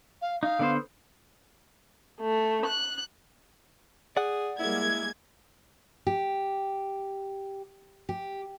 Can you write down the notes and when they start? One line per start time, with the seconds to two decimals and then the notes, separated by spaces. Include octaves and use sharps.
0.21 F5
0.43 D#4 F5
0.59 D3 B3 C5
2.21 A3
2.67 F#6
4.17 G#4 D5 F#5
4.60 G3 G#3 A#3 E4 G#6
6.07 G4
8.09 G4